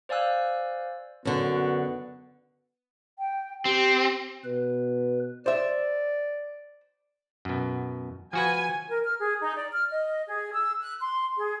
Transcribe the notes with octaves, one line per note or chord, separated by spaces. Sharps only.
C5 D5 F5 G#5 E6 F#6
F#2 D3 B3 F#4
G5
C4 G4
B2 B4
C5 D5 E5
F#2 B2
F3 F#4 B4 G#5
A#4
F6
G#4
D#4
D5
F6
D#5
G#4
E6
F#6
C6
G#4